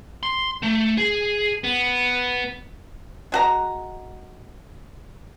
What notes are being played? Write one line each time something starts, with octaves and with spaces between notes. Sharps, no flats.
C6
A3
G#4
B3
G#3 F#4 A#5